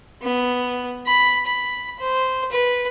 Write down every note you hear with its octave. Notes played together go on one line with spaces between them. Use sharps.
B3
B5
B5
C5
B4